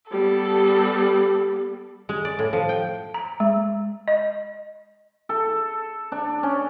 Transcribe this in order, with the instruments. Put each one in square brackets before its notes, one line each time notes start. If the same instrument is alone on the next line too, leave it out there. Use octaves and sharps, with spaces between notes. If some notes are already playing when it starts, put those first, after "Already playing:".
[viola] G3 B3 [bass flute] G4 [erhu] A4
[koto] G#3
D5
A2
F3
G5
[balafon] A#5
G#3
D#5
[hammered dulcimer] A4
D4
C#4